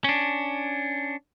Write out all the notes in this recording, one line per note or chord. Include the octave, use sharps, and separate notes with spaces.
C#4 D4